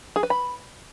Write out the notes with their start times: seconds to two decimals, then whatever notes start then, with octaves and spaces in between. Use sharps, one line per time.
0.16 G#4
0.23 B4
0.30 B5